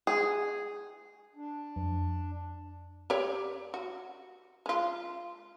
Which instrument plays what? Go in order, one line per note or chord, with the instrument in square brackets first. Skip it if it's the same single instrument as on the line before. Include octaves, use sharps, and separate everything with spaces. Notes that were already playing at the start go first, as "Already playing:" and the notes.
[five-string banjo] G#4
[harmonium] D4
[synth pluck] F2
[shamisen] G4 C#5 D5
F#4
G#3 F4